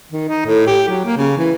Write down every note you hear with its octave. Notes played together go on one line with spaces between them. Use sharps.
D#3
D#4
A2
G4
F#3
A#3
C#3
E3